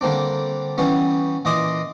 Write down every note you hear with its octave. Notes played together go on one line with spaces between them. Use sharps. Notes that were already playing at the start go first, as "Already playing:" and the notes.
D3 G3 A#3 C4 D4
E3 G3 B3 C#4
A#2 E3 D#5 C6 D6 D#6